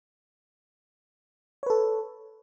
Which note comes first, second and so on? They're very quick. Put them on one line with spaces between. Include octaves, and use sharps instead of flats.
C#5 B4 A4